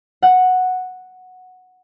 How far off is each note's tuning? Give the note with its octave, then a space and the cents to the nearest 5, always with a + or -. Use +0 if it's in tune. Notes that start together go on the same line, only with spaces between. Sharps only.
F#5 -5